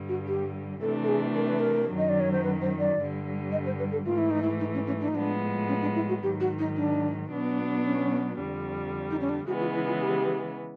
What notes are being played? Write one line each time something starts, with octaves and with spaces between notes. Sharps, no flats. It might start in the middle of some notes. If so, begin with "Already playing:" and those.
Already playing: G2 D3 G3
F#4
G4
C3 E3 A3 D4 A4
A4
G#4
A#4
B4
A#4
F#2 D#3 F#3
D#5
D5
C#5
C5
B4
C5
D5
G2 D3 G3
D#5
C5
B4
A4
G#2 E3 A3 F4
E4
D#4
E4
D#4
C#4
C#4
D4
D#4
A2 F3 G#3 B3 D4
C#4
D4
E4
F#4
G#2 D#3 F#3 G4
F#4
D#4
D4
B2 F#3 B3 D4
C#4
F2 D3 G3
D#4
C#4
D4
C#3 E3 G#3 B3 F#4
F4
E4
F4
G4